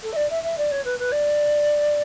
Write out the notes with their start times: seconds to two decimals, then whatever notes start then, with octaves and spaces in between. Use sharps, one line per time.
0.03 A4
0.12 E5
0.16 D5
0.30 E5
0.43 E5
0.57 D5
0.71 C#5
0.84 B4
0.99 B4
1.11 D5